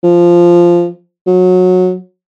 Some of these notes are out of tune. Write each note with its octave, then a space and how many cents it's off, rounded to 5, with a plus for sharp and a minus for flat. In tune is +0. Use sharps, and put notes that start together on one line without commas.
F3 -10
F#3 -20